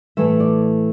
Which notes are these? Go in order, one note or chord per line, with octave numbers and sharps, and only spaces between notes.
A2 E3 A3 E5
D5